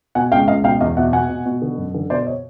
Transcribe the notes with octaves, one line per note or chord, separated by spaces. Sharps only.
B2 F#5 G#5
C#2 F5 G5
C#2 D#5 F5
B2 F5 G5
E2 D#5 F5
B2 E5 F#5
B2 F#5 G#5
B2
B2
D3
F#2
D3
B2 C5 D5
C#5 D#5